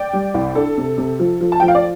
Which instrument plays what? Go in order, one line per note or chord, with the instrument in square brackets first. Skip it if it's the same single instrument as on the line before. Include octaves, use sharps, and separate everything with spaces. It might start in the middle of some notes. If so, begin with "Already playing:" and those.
Already playing: [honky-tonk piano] D5 G5
G3
C2
D4 A4
C3
C3
F3
F3
A5
F3 G5
F5
D5